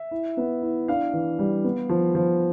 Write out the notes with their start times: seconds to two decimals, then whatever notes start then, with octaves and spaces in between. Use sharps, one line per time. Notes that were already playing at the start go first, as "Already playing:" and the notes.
Already playing: E5
0.11 E4
0.37 B3
0.62 E4
0.88 D4 F5
1.13 E3
1.39 G3
1.64 B3
1.89 F3
2.15 F3